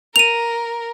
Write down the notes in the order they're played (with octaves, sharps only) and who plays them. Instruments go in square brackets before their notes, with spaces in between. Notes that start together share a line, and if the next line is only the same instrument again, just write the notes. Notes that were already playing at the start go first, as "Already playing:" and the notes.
[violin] A#4 [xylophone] D#7 F7